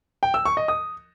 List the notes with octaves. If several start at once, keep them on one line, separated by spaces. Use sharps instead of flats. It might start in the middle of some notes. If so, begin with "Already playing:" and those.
G5
E6
C#6
D#5
D#6